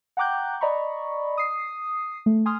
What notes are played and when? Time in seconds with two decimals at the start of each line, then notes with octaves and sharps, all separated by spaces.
0.17 F#5 G5 A#5 D6 F#6 G6
0.61 D5 D#5 A#5 B5 C#6
1.38 D#6 C7
2.26 A3
2.46 G#5 C6 D#6 F6